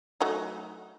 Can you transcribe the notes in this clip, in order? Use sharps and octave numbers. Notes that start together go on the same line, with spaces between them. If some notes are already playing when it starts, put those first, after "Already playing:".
F#3 A3 D#4